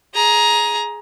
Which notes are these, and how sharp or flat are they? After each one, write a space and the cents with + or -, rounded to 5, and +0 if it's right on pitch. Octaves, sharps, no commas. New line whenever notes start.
G#4 +10 A#5 +15